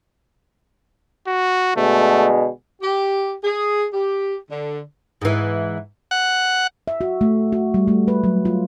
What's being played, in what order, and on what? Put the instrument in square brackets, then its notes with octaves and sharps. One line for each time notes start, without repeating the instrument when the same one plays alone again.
[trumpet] F#4
[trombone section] B2 D3 G#3 [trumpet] A3
[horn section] G4
G#4
G4
D3
[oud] G#2 E3
[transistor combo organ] F#5
[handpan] E5
F#4
A3
F#4
G3
A3
B4
F#3
F4